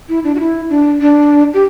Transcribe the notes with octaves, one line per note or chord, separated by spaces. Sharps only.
E4
D4
F#4
E4
D4
D4
G4